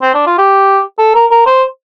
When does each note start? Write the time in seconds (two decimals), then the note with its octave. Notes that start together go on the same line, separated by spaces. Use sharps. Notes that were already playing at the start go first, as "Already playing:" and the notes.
0.02 C4
0.14 D4
0.27 F4
0.38 G4
0.99 A4
1.15 A#4
1.31 A#4
1.46 C5